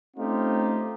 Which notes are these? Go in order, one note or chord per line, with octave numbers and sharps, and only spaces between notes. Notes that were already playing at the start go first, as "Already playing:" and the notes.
A3 C4 C#4 D#4 F4 G4